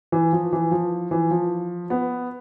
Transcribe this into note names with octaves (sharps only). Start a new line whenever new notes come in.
E3
F3
E3
F3
E3
F3
B3